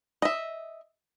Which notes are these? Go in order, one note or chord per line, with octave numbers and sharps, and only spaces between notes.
D#5 E5